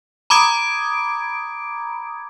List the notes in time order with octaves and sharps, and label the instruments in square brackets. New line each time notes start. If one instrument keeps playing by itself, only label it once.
[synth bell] A#5 B5 D6 D#6 G#6 D7